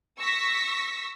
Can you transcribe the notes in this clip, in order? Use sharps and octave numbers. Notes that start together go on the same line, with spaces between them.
C#6 E6 A#6 B6